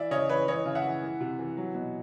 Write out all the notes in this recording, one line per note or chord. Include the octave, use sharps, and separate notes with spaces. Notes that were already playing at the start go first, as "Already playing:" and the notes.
Already playing: E3 D5 E5
C#3 C#5 D#5
E3 B4 C#5
E3 C#5 D#5
C#3
E5 F#5
E3
E3
C3
E3
F#3
B2